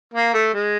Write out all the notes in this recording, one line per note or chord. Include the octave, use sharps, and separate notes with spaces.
A#3
A3
G#3